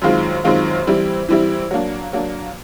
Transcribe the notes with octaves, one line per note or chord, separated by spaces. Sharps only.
F#2 D#3 G#3 C4 F4
F#2 D#3 G#3 C4 F4
E3 G3 C4 E4
E3 G3 C4 E4
F#3 A#3 D4
F#3 A#3 D4